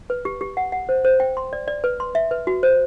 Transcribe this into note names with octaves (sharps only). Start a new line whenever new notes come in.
B4
G4
G4
F#5
F#5
C5
C5
G5
C6
D5
D5
B4
C6
E5
B4
F#4
C5